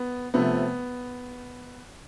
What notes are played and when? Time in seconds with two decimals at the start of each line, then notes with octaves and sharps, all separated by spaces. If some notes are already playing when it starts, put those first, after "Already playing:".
Already playing: B3
0.34 C3 F3 A3 B3